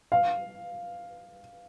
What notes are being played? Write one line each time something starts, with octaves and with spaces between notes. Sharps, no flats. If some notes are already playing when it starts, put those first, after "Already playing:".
F5